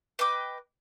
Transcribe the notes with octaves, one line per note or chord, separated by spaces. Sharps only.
B4 D#5 G5 D6